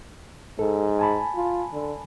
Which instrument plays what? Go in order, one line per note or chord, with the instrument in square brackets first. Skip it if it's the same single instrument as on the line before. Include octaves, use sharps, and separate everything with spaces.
[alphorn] G#2 [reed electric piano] A4
[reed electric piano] G#5 A5 B5
[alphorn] F4
D3